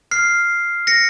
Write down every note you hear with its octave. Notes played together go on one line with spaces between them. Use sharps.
F6 C7
A#6 C#7